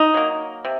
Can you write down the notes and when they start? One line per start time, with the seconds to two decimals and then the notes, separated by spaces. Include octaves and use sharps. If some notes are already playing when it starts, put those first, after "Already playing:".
Already playing: D#4
0.14 F#3 A#3
0.65 C3